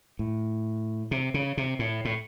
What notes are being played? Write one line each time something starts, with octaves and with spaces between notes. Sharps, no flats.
A2
C3
C#3
C3
A2
A2